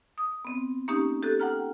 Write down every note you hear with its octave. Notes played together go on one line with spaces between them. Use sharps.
D#6
B3 C4
A#3 C#4 D#4 G4
G4 A4 F#6
F#5 G5 A#5 F6